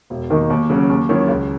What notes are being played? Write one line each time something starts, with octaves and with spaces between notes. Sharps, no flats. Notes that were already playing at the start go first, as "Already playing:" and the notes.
E1
D#2 D#3 A#3 D#4
D#2
C#3 F#3 C#4
D#2
D#3 F#3 C#4 E4
C#2